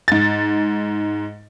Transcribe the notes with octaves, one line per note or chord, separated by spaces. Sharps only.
G#2 A6